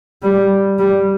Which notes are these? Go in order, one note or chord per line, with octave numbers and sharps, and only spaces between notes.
G3
G3